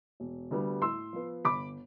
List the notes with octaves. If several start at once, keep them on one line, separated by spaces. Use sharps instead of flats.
E1
D2 D3 G3 B3
A2 C6 E6
F3 B3
G1 B5 D6